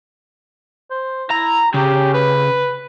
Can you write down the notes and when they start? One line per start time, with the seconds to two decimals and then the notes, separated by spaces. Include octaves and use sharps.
0.90 C5
1.31 E4 A#5
1.74 C#3 G4
2.14 B4